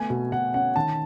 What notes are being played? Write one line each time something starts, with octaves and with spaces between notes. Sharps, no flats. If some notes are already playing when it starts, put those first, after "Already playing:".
Already playing: A3 B3 G#5
B2
B2 F#5
C#4 F#5
D#3 A5